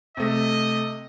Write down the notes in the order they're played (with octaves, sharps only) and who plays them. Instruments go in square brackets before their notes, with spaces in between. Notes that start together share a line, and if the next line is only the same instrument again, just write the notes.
[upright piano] C3 A3 [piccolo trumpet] D#5